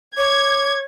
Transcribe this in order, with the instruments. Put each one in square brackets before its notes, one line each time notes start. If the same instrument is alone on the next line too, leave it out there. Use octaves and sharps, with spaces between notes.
[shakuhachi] C#5 [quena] D6 [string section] G#6